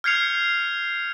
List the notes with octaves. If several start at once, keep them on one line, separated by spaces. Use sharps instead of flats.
F6 G6 G#6 C7 C#7 F7